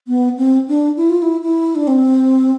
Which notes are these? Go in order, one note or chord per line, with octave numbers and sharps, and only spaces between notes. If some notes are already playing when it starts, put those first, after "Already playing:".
B3
C4
D4
E4
F4
E4
E4
D4
C4